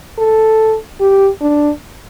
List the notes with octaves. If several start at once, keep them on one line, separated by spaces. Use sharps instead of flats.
A4
G4
D4